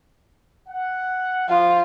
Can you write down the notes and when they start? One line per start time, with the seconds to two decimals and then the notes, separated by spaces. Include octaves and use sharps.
0.69 F#5
1.49 F3 F4